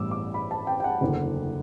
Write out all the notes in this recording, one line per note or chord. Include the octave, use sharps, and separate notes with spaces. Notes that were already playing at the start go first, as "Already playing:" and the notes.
Already playing: A1 G2 E3 G3 B3 D6 E6
D6
B5
A5
G5
G5
F#5
F#1 E2 D3